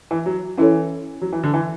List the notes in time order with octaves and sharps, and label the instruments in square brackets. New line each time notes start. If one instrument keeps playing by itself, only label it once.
[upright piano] E3
F#3
[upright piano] E3 [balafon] C#4 E4 A4 C#5
[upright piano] F#3
E3
D3
E3